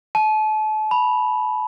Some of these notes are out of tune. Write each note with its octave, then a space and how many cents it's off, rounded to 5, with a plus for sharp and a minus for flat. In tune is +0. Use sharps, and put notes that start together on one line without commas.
A5 -35
B5 -10